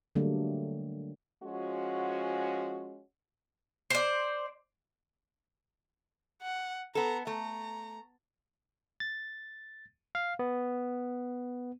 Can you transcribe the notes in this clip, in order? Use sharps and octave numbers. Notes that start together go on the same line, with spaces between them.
D3 F#3 G3 A3 A#3 D4
F3 G#3 C#4 F#4
C5 D5
F#5
B3 A4 A#5
A3 A#5
A6
F5
B3